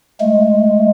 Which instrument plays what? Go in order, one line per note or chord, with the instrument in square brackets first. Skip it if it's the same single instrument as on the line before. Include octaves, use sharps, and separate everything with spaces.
[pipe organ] G#3 A3